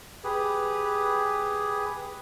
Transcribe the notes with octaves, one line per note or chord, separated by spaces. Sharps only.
G4 G#4 B4